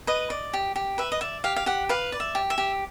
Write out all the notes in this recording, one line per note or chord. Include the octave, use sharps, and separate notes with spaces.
B4 D#5
D5
G4
G4
B4 E5
D#5
D5 E5
G4 F5
F5
G4 F#5
B4 F5
D5
E5
G4
E5
G4